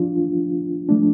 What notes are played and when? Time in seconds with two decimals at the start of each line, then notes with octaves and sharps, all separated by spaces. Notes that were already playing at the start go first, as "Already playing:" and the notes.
Already playing: F3 D4 F4
0.89 F3 A3 D4